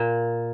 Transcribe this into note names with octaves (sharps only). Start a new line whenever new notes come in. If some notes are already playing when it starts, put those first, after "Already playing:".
Already playing: A#2